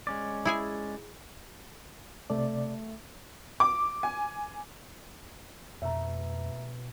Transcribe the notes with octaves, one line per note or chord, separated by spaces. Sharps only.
G#3 C#4 D5
E4 G#4 G#5
C3 A3 D5
D6
G#5
F2 B2 A3 E5 A#5